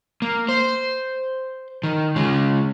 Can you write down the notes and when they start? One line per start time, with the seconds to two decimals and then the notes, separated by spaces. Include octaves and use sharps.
0.22 A#3
0.49 C5
1.83 D#3
2.16 C#3 G#3